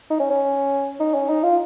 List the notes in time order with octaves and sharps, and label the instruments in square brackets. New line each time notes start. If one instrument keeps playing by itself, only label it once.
[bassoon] D#4
C#4
C#4
D#4
C#4
D#4
F4